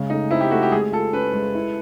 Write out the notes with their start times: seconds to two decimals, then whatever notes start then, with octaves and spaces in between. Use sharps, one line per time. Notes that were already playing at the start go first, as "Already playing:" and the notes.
Already playing: C#3 G#3
0.10 A3 D#4
0.31 C4 E4
0.41 G4
0.51 A3 F#4
0.62 G4
0.72 G#3 G#4
0.92 F4 A4
1.13 C#4 B4
1.34 G#3
1.55 E4